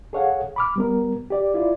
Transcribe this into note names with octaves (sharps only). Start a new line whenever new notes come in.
G#4 A4 C#5 F5 F#5
B5 D6 F6
G3 B3 A#4
G4 D5
E4 F4 D5